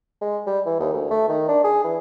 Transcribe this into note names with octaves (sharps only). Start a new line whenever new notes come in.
G#3
G3
E3
D#2
D2
A3
D#3
D4
G#4
E3